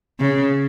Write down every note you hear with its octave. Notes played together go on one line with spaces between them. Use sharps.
C#3